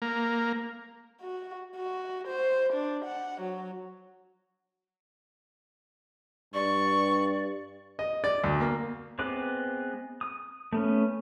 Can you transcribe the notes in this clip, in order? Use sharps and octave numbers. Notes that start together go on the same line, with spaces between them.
A#3
F#4
F#4
C5
D4
F#5
F#3
G2 D5 C#6
D#5
D5
D2
A#3
G#3 B3 C4 B4 D6
D#6
A3 B3 C#4